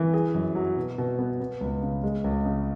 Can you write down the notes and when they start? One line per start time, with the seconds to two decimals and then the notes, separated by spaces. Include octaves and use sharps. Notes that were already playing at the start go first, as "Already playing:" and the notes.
Already playing: E3
0.14 G#4
0.35 F#2
0.55 F#3
0.77 B2
0.98 B2
1.19 B3
1.40 B3
1.61 C#2
1.82 C#3
2.03 G#3
2.24 C#2
2.45 C#3